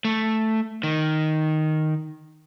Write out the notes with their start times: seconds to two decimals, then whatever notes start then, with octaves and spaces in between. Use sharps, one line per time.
0.05 A3
0.83 D#3